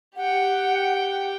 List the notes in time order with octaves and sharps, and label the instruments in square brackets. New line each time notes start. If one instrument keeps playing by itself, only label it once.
[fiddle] G4 G5 [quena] F#5